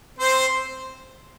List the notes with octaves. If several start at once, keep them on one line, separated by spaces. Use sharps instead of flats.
C4 C5